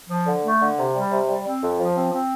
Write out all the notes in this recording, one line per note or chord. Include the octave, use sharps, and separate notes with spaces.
F3
D3
A3
D3
C3
G3
C3
G3
C4
F2
F3
C4
C4